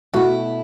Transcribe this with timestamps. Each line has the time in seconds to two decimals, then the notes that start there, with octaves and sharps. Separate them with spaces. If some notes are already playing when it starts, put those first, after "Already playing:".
0.14 B2 A3 E4 F#4